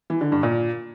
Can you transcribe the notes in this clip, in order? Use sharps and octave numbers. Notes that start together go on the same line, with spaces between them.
E3
D3
G2
A#2